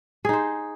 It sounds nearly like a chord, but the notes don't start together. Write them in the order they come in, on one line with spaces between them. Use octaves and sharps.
G#4 D#4 C5